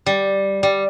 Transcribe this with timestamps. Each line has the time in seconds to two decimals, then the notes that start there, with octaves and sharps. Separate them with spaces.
0.06 G3
0.63 G3